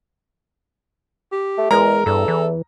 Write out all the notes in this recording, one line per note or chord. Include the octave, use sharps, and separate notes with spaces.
G4
A3
E2 G#3 A#4 A#5
E2 G2 A4
E3